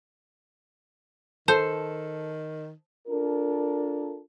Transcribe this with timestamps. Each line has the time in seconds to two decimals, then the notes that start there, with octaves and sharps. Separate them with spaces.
1.48 D#3 A4 C5 A5
3.08 D4 F4 A4 A#4